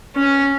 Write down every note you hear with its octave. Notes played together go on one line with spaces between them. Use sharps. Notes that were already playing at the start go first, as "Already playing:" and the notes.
C#4